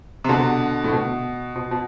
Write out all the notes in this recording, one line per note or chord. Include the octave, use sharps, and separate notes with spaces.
C3
B2 D3
A2
B2
B2
B2